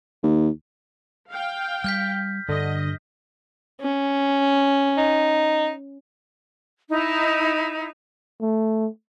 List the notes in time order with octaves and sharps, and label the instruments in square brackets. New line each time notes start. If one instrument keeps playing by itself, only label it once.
[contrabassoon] D#2
[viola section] F5 G5
[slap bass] G3 [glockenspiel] F6 G6 B6
[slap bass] G2 [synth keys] D3 [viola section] D#5
[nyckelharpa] C#4
[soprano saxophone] D#4
[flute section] D#4 E4
[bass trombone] A3